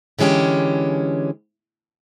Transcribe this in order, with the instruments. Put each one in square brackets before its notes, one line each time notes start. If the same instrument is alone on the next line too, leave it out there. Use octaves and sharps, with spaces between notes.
[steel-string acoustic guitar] D3 E3 G#3 C#4 G4